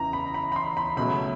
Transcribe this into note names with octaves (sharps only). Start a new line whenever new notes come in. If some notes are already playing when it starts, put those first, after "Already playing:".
Already playing: E2 C#3 E3 A#5
B5
B5
B5
C6
B5
C#2 B2 F#3 A3 B5